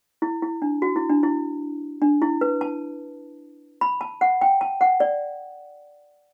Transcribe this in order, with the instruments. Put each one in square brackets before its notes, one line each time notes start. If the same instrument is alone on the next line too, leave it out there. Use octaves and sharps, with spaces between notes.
[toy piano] E4
E4
D4
F#4
E4
D4
E4
D4
E4
B4
A5
B5
A5
F#5
G5
A5
F#5
D5